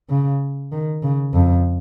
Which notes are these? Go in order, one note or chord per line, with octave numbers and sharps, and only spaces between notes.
C#3
D#3
C#3
F2